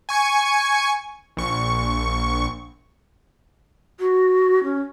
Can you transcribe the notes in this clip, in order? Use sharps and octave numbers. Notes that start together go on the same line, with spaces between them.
G#5 C#6 G#6 C#7
A#1 C#6
F#4
C#4